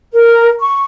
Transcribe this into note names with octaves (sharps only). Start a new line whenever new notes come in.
A#4
C#6